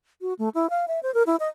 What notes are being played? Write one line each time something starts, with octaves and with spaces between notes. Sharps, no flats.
F#4
A3
E4
F5
E5
C5
A#4
E4
D#5